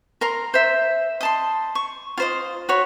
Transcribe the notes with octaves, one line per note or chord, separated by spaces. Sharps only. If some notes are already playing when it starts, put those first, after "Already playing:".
A#4 A#5 C6
C5 E5
D#5 A5 C6
C#6
F4 C5 D#5
F#4 C#5 B5